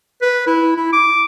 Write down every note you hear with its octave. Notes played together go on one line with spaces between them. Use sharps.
B4
E4
E4
D6